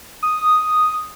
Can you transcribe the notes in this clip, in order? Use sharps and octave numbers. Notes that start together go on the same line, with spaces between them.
D#6